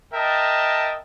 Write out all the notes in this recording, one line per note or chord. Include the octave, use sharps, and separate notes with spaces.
A#4 D#5 E5 G5 A5